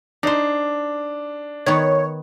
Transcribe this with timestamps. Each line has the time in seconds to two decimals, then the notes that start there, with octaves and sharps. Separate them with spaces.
0.23 D4 D#4 C5
1.66 D#3 B3 C#5